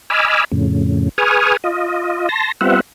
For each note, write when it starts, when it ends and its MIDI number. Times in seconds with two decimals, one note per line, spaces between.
0.10 0.45 75
0.10 0.45 80
0.10 0.45 83
0.10 0.45 86
0.10 0.45 88
0.10 0.45 89
0.52 1.09 41
0.52 1.09 45
0.52 1.09 49
1.18 1.57 68
1.18 1.57 71
1.18 1.57 80
1.18 1.57 85
1.18 1.57 87
1.18 1.57 89
1.64 2.29 65
1.64 2.29 75
2.29 2.52 81
2.29 2.52 84
2.29 2.52 94
2.61 2.81 55
2.61 2.81 59
2.61 2.81 60
2.61 2.81 65
2.61 2.81 76
2.61 2.81 78